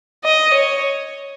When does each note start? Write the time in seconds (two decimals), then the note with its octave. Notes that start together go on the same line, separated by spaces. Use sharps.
0.25 D#5
0.54 C#5